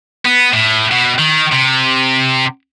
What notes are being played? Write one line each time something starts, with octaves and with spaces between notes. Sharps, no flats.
B3
A2
B2
D#3
C3